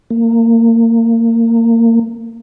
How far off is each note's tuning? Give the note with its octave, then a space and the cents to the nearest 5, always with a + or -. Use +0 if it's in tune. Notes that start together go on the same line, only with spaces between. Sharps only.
A#3 -25